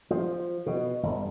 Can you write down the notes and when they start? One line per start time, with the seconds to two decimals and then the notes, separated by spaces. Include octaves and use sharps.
0.11 F3
0.66 B2
1.03 G1